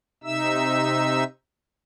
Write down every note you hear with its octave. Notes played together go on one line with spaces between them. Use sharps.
C3 D#4 E5 E6